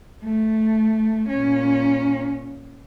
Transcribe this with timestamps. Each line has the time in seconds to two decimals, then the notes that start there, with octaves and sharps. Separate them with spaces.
0.24 A3
1.29 A#2 C#4